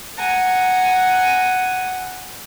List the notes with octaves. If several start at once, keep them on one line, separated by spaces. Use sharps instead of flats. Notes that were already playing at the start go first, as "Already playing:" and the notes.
F#5 G#5 A#5